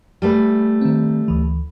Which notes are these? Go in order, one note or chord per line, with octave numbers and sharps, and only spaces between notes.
G3 A3 B4
D#3 C4
D2 E3